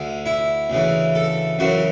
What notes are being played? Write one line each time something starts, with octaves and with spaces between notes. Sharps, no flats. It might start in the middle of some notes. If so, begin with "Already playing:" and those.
Already playing: D2 D3
E4
D2 C#3 E3
A4
F#2 C#3 E3 F#4